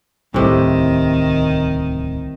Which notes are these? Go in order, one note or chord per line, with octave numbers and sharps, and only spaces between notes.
D1 C2 A2 C3 D#3 G3